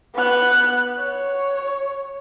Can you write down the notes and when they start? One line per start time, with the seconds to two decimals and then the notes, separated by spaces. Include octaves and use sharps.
0.15 B3 F#6
0.99 C#5